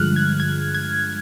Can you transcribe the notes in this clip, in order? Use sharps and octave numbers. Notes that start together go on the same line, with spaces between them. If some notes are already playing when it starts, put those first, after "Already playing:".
Already playing: G2 D3 F3 G#3 F6 F#6
G#6
G#6
G#6